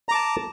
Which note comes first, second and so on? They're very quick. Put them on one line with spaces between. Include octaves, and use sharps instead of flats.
A#5 D6 A5